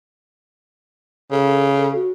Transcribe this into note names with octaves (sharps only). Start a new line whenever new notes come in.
C#3 A4
F#4